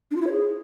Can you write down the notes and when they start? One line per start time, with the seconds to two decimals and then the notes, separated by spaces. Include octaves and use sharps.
0.11 D4
0.16 F4
0.21 E4
0.27 C#5
0.32 G#4